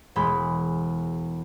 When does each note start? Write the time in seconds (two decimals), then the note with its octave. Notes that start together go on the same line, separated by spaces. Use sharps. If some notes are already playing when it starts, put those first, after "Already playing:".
0.16 E1 G#3 B5